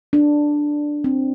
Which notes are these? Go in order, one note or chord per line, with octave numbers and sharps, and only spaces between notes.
D4
C4